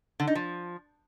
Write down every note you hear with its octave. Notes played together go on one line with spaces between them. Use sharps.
D3
D#4
F3